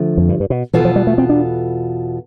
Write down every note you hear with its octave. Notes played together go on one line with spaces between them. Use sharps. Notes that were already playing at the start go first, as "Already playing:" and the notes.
Already playing: D3 F3 A3
F2
G2
G2
B2
E2 B2 E3 B3 F4 A4
F3
G3
A3
C4
D4